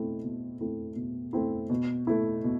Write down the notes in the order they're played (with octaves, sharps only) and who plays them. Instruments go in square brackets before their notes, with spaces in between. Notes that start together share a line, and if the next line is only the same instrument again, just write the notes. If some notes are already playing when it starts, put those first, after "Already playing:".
Already playing: [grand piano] B2 A3 C4 E4
B2
A3 C4 E4
B2
A3 C4 E4
B2
A3 E4
B2